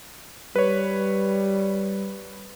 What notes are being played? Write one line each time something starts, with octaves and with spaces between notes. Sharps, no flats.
G3 B4 C#5